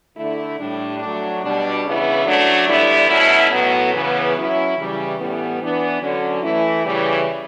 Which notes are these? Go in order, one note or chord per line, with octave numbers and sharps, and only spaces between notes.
D3 A3 E4
A2 G3 D4
F#3 A3 D4
B2 G3 D4
C#3 E3 B3 E4
F#3 A3 D4
D3 G3 B3 E4
B2 F#3 A3 C#4 E4
A2 F#3 B3
C#3 E3 B3
F#3 C#4 E4
C#3 E3 G3
A2 E3 G3 B3
E3 B3 D4
D3 F#3 C#4
E3 A3 E4
C#3 E3 G3